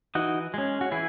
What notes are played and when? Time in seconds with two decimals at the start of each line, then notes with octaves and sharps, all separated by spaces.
0.15 E3 D#4 F#4
0.54 G#3 C#4
0.81 F#4
0.92 E3 E4 G#4